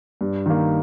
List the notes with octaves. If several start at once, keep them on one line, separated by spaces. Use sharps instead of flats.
G2
D#3 A#3